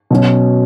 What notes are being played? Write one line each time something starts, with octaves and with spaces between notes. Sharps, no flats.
B2 F#3 C#4